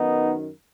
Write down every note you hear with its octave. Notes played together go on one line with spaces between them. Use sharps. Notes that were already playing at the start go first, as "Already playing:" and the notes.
Already playing: F#2 D#3 B3 D#4